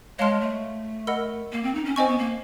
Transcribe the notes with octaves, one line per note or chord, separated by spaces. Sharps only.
G#3 C#5 F5 A5 C6 F6
A3
A#4 D#5 F#5 B5 E6
A#3
C4
D#4
C#4
C4 C5 D#5 G#5 C#6
B3
A#3